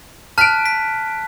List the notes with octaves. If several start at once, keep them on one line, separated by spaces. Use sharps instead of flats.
A5 F6 F#6 B6 D7
B6